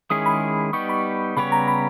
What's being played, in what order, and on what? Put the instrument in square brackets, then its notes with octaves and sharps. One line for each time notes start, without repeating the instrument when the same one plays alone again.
[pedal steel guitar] D#3 G#3 C#4 E4 G#4 [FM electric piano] D#6
[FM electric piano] B5
[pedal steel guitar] G3 B3 D#4 G4 [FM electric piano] C#6
[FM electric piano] B5
[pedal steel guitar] C#3 G3 B3 G4 C#5 [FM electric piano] B5
[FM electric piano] A#5
B5